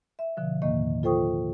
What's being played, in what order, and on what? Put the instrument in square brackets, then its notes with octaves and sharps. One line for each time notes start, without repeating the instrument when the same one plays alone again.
[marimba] E5
B2 D3 F3
D#2 A2 D#3 A#3 D#5
F4 A4 C5 G5 C#6 D#6